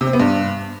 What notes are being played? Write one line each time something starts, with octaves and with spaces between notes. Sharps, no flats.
C3
C4
B3
G2